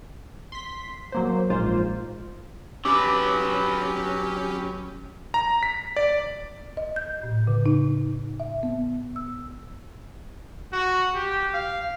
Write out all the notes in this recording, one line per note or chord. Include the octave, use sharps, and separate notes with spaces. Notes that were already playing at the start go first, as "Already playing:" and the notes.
C6 B6
F#3 A#3 C5
A#1 G#2 G#3 A#3 F4 C5
F#3 C#4 G4 B4 D6
A#5
B6
D5
D#5
G6
A2
C#3
D#4
E5
B3
E6
F#4
G4
F5